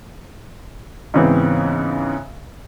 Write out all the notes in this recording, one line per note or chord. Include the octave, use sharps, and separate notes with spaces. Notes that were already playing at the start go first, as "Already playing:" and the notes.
G#2 C#3 E3 B3 C4